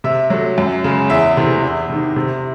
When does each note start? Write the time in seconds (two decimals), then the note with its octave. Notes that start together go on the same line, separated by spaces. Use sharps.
0.04 C3 E5
0.30 F#3 A3
0.58 F#2
0.84 C#3 G#3
1.10 E2 E5
1.37 C3 E3 A3
1.63 E2
1.89 C3 D#3
2.16 C3